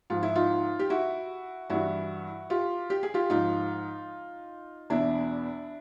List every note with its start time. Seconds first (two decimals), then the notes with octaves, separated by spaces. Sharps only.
0.10 G#2 F3 F4
0.23 E4
0.35 D#4 F4
0.79 G4
0.90 E4 F#4
1.70 G2 E3 E4 F#4
2.50 F4 G4
2.90 G4
3.03 G#4
3.14 F4 G4
3.30 G#2 F3 D#4 F4
4.90 E2 B2 D4 E4